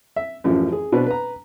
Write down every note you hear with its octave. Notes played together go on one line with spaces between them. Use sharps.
E5
A1 F#2 E3 F3
G#4
B2 C4 D4 B4
B4 A#5